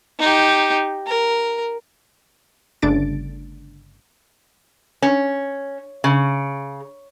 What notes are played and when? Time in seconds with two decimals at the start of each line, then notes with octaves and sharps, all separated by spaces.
0.19 D#4 G4
1.07 A#4
2.82 G1 C#3 A3 D4 A6 D7
5.02 C#4
6.04 C#3